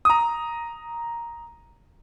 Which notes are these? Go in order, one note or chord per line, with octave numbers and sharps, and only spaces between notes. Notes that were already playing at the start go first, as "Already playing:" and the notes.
A#5 D#6